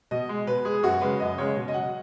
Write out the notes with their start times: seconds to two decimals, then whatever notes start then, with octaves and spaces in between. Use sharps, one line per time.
0.11 B2 D#5
0.29 G#3
0.47 B2 B4
0.65 G#3 G#4
0.83 F#2 F#4
1.01 C#3 G#3 B4
1.20 F#2 D#5
1.38 C#3 G#3 C#5
1.56 B2
1.68 D#5
1.74 F#3 F#5